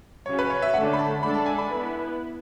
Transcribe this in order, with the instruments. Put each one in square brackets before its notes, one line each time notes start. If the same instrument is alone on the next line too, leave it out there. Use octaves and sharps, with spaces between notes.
[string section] C#3 F#3 C#4 [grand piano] C#5
[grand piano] B4
C#5
E5
[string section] D3 A3 D4 A4 [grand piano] F#5
[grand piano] B5
A5
[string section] G#3 D4 A4 D5 [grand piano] B5
[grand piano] A5
G#5
B5
[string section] B3 E4 B4